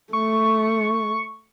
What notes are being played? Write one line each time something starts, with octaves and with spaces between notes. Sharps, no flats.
A3 C#6